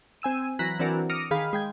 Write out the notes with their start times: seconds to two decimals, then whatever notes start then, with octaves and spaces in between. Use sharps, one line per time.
0.22 C4 G#5 E6 D#7
0.59 E3 F#3 A#5 F#6 A#6 B6
0.79 E3 C4 D4 F#4 A#4
1.10 D6 D#6 F6 A#6 C#7
1.31 D#3 G#4 F5 B5
1.53 G#3 G5 G#6